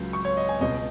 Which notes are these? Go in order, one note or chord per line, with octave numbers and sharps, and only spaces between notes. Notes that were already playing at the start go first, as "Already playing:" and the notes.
Already playing: C#2 C#3 F#3
C#6
C#5
D#5
G#5
C#2 B2 G#3 B3 D#5